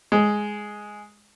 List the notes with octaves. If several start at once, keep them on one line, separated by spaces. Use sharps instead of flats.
G#3